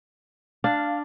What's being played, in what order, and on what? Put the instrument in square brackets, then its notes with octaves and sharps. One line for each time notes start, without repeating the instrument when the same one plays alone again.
[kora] D4 [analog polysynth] F5